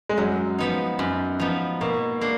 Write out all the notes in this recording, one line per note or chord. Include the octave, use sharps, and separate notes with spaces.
G#3
F#2 F#3
F3 B3 D#4
F#2
F3 B3 D#4
B2 A#3
A#3 D4